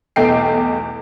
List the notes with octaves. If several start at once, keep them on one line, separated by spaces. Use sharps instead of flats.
B1 E2 A3 G5 C7